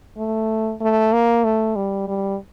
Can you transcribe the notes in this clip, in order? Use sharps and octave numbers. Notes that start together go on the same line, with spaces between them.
A3
A3
A#3
A3
G3
G3